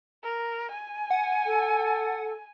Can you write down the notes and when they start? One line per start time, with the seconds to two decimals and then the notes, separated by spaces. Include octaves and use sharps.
0.23 A#4
0.71 G#5
1.10 F#5
1.46 A4